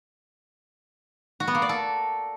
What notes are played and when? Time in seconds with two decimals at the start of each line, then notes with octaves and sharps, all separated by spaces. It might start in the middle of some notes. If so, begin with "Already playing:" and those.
1.40 F#4
1.47 B3
1.55 A#3
1.62 D5
1.69 A4